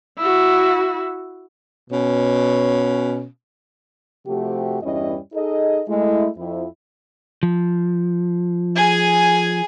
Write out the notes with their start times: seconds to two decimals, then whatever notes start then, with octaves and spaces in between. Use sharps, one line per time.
0.18 E4 F#4
1.90 B2 C#4
4.27 C3 F3 A3 F#4 G4
4.83 E2 G2 G3 C#4 E4 D#5
5.34 D#4 G#4 A4 D#5
5.89 G#3 A3 E4
6.37 F2 E4
7.43 F3
8.76 G#4 G#5